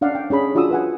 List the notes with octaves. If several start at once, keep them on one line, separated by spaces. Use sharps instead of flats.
C#4 D4 D5 F5 F#5
G5
C#4 D4 G#4 B5
D4 F4 F#4 G#4 D#6 E6
B4 F#5 G#5